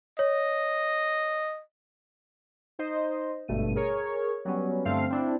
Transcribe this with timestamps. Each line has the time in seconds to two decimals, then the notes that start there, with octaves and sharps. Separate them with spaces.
0.19 C#5 D#5
2.79 D#4 C5 D#5
3.48 G#1 G2 B2 A3 D#7
3.75 G#4 A#4 C#5
4.45 F#3 G3 B3 C#4
4.85 G2 D3 A3 C4 F5 C7
5.10 C4 D4 E4